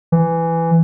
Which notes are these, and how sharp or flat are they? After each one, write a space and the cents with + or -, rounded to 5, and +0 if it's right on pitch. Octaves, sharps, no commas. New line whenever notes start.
E3 +10